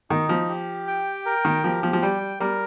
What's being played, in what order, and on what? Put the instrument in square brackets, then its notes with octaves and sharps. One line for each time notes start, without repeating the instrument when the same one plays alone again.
[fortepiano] D#3 [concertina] D#4
[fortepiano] F3
[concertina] G4
G5
A#4
[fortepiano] D#3
[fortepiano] F3 [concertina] G4
[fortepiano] F3
F3
[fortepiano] G3 [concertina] G5
[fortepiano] G3 [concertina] A#4